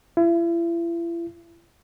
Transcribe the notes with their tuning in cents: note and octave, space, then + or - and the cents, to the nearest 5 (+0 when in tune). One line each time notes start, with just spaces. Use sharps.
E4 +40